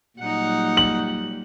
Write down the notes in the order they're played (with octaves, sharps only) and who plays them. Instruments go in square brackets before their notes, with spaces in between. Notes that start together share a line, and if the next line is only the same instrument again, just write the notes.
[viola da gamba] A#2 F#3 G3 [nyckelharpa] D#4 F#5
[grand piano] F#7